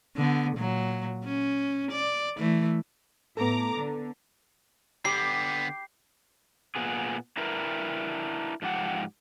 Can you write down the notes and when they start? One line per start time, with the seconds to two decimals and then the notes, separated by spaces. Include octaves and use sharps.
0.17 D3 B3
0.57 A#2 F#3
1.24 C#4
1.92 D5
2.38 E3 A3
3.37 A2 B3 A4 A#5 D6
3.78 D3
5.05 D3 B3 G4 B5 D6 C7
6.76 A#2 B3 G#4
7.37 D4 E4 A#4 B4
8.62 G#2 F3 G4 F#5